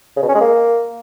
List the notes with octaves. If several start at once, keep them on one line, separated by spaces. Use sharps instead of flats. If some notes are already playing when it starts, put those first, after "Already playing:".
C#3
B2
C#4
G#3
A#3